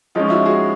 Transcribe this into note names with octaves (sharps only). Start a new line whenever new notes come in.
F3 G#3 C#4 D#4 F4
E4 F#4
F#4 G#4